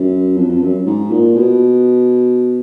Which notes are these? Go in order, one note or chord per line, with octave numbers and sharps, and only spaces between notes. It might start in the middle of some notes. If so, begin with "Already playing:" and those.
Already playing: F#2
F2
F2
F#2
G#2
A#2
B2